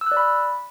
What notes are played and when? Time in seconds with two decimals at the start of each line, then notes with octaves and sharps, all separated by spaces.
0.01 E6
0.06 F#6
0.12 D5
0.17 B5